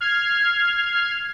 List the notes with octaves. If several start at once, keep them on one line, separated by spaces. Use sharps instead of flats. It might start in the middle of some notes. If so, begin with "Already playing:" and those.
F6 G#6 C7